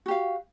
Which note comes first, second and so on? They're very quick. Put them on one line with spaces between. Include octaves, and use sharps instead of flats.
F#4 G4 F5